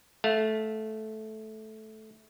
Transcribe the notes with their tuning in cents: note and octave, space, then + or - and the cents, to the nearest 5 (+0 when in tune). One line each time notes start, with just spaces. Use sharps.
A3 -10 F5 +15